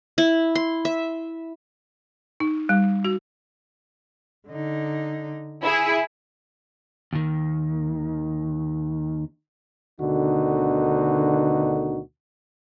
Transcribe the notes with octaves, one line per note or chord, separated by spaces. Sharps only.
E4
C6
E5
D#4
G3
F#4
D3 D#4
E4 G#4 E5
D#2 D#3
D2 B2 D3 D#3 D#4 F#4